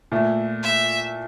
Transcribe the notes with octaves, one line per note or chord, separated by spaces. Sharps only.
A#2 A3 E4
E5